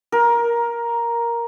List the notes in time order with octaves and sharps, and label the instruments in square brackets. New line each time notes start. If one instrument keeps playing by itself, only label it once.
[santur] A#4